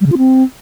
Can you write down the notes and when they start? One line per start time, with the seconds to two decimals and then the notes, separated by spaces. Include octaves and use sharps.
0.01 G3
0.06 C#3
0.12 F4
0.18 C4